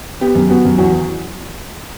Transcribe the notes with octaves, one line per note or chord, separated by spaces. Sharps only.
B3 G4
F#2
B3 F#4
F#2
E2 F#4